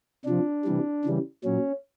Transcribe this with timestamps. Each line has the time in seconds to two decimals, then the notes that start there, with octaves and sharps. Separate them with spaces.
0.25 C3 F3 D4
0.64 C3 E3 G3
1.05 C#3 E3 G3
1.44 A#2 F#3 C#4